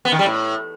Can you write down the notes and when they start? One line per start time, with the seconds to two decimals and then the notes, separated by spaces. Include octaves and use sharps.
0.05 B3
0.12 D#3
0.19 G3
0.26 A2